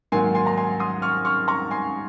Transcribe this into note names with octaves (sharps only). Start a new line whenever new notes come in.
G#2 D#3 F#3 A#3 G#5 C6
G#5 C6
A#5
G#5 C6
C6 D#6
C#6 F6
C#6 F6
A#5 C#6
G#5 C6